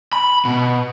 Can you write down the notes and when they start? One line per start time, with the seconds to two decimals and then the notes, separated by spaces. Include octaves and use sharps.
0.13 B5
0.45 B2